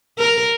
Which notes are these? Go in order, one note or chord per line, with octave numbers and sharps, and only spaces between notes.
A#4